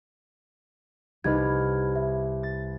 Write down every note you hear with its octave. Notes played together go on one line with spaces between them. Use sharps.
C2 D#4 B4 D#5 F6 G#6
E5
A6